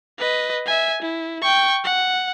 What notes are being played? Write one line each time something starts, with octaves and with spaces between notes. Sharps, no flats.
B4 D#5
E5 G#5
E4
G5 C#6
F#5